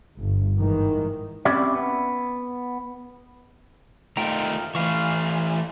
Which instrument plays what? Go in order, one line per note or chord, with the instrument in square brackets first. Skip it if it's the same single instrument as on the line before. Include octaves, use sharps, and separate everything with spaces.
[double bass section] G1
G#2 D#3 E3
[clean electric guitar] C4 C#4 E4 G4 D5 E5
B3
[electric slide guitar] D#3 A3 D#4 [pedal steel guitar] F4 G5 A#5
[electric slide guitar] E3 A3 [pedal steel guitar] F5 C#6